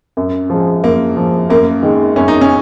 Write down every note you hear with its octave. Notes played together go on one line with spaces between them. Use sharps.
F#2
F3 G#3
F#2 A#3
F3 G#3
F#2 A#3
D#3 G#3
F#2 C#4
D#4
C#4